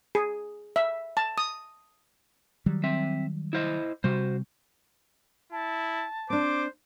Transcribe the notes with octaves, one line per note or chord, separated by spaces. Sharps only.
G#4
E5
A5
D#6
D#3 F#3 G3
C4 E5
E4 C5 D#5
C3 G3 F#4 C5
E4 A5
C4 D4 C5 D6